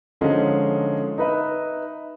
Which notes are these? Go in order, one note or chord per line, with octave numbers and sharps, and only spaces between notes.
D3 F3 G#3 C#4 D#4
D#4 B4 E5